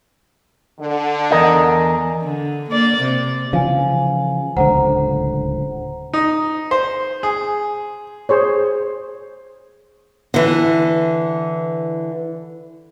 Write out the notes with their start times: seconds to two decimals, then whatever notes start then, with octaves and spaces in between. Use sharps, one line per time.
0.79 D3
1.31 E2 A#4 D#5
2.22 D3
2.70 A#3 D5
3.01 C3
3.53 C#3 E3 F3 F5 G#5
4.57 D1 C#2 D3 C5 F#5 A#5
6.13 D#4
6.71 C5
7.23 G#4
8.29 G#4 C5 C#5
10.34 D3 E3